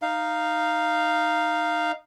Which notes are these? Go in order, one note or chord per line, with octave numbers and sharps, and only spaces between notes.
D#4 F5